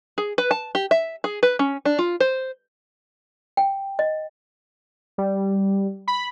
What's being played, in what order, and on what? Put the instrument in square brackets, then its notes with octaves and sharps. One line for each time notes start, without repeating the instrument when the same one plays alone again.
[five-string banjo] G#4
B4
A5
G4
E5
G#4
B4
C#4
D4
F4
C5
[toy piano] G5
D#5
[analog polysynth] G3
B5